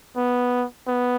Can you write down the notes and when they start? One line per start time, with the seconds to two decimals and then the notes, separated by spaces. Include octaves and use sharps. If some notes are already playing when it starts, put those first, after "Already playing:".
0.16 B3
0.87 B3